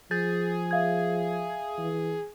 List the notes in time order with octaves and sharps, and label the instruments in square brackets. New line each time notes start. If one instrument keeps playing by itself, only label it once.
[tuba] F3 [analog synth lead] G#4 [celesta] G6 A6
[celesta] E5 F5 G#6
[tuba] E3